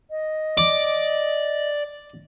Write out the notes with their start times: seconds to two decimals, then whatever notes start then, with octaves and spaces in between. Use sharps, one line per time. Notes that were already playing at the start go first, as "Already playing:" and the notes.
0.10 D#5
0.58 D5 D6